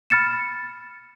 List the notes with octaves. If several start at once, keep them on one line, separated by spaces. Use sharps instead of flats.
B5 F6 A6 C#7 E7